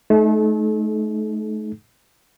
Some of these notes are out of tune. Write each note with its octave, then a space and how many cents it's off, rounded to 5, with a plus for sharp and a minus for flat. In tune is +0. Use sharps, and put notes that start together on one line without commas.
A3 -30 D#4 +0 A4 -45